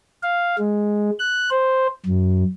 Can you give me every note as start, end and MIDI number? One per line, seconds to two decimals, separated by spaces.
0.23 0.56 77
0.58 1.10 56
1.19 1.50 90
1.51 1.87 72
2.06 2.44 42